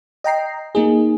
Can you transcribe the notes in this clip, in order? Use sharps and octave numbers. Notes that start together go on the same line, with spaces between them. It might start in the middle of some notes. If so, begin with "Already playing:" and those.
D#5 G5 A#5 C7
A#3 D#4 G#4